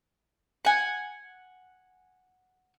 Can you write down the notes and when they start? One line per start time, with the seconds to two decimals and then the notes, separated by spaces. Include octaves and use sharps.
0.65 F#5 G#5